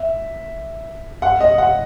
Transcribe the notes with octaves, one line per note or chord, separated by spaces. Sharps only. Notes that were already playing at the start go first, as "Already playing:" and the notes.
Already playing: E5
F#5
D#5
F#5